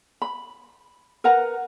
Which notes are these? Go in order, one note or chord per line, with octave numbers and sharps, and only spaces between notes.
B5
A#4 B4 F#5 A#5